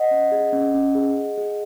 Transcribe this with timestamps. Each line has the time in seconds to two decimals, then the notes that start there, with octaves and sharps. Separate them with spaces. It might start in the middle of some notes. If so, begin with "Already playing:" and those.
Already playing: D#5 F#5
0.11 C#4
0.32 G#4
0.53 C#4
0.74 C#4
0.95 G#4
1.17 G#4
1.38 G#4